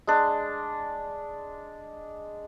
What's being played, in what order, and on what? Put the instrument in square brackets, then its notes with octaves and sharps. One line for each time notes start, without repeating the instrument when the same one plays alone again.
[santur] G#3 D4